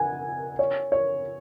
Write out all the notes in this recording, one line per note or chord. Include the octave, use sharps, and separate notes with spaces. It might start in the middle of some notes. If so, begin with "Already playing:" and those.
Already playing: F#5 G#5
C#5
C#5